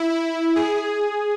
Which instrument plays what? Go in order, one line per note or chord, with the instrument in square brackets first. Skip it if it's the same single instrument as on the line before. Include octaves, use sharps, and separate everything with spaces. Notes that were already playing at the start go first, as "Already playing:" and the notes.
Already playing: [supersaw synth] E4
G#4